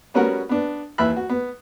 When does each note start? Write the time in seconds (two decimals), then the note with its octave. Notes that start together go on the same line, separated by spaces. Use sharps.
0.14 G3 B3 C#4 F#4 A#4 F#5
0.49 B3 D4
0.98 D#2 E3 E5 B5 F#6
1.16 F#4
1.29 B3